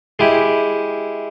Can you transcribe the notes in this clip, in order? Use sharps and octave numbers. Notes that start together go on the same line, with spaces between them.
G#3 E4 G4